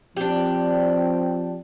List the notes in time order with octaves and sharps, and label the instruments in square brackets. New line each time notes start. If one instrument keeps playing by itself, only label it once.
[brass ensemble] F3 C4 [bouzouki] D4 G4